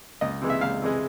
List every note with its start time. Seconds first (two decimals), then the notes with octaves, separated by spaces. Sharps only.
0.21 C#2 D#5
0.42 C3 E3 G#3
0.50 E5
0.61 C#2 F5
0.82 C3 E3 G#3